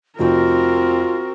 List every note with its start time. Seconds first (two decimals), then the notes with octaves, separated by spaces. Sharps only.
0.19 F1 F3 C4 F4 F#4 A#4 G5